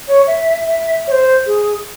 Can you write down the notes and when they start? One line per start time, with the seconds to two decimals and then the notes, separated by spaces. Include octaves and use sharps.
0.08 C#5
0.27 E5
0.67 E5
1.07 C#5
1.12 C5
1.47 G#4